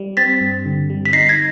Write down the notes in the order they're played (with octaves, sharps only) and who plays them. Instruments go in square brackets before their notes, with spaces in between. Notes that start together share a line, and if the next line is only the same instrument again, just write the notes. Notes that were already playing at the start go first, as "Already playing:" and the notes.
Already playing: [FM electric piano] G3
[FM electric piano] C4 [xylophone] A6 B6
[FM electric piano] G2
D3
G3
[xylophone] B6
[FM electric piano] D#4 [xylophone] A#6 C7
[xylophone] G#6 A#6